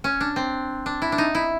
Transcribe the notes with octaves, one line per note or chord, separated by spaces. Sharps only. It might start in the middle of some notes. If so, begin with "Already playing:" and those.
C#4
D4
C4
D4
E4
D4
D#4
E4